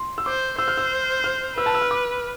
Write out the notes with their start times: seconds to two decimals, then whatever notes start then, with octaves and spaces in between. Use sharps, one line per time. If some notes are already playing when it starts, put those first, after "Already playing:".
Already playing: C6
0.18 E6
0.26 C5 D6
0.59 C5 E6
0.68 F6
0.77 E6
1.24 F6
1.57 B4 E6
1.66 A5
1.74 E6
1.81 F6
1.91 D6